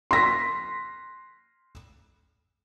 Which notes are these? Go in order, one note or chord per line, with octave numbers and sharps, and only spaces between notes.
C6 A#6 B6